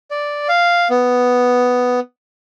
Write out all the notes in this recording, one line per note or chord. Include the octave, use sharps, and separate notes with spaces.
D5
F5
B3